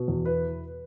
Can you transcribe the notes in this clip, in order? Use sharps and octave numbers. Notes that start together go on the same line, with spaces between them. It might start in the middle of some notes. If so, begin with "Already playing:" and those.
Already playing: B2
E2
E4 B4